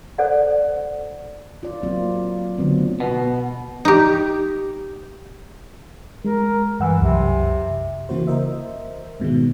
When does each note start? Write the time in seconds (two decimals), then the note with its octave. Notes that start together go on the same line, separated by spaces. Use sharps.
0.18 A4 C5 D5 F#5
1.63 F4 D5
1.83 F#3 A#3 C4 F4
2.58 D3 F#3 A3 B3 C4
3.00 B2
3.85 D#4 G4
6.25 G#3 A#4
6.80 G2 E3 F#5 E6
7.01 C2 F#2 C3
8.09 C#3 E3 A#3 F#4 C5
8.27 A#4 C5 D#5 E5
9.20 G#2 B2 D#3 G#3